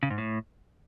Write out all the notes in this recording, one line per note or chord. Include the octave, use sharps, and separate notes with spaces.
C#3
G#2
A2